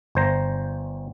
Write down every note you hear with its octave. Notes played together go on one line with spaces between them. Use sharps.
G1 C5 A#5